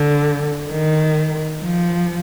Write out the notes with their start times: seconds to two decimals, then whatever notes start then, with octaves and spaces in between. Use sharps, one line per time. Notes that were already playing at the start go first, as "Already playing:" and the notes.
Already playing: D3
0.70 D#3
1.62 F3